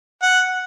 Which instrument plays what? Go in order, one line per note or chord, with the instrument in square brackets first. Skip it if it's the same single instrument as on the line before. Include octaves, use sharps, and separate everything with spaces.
[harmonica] F#5